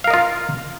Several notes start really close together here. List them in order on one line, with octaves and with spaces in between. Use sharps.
F5 A#4 D#5 F4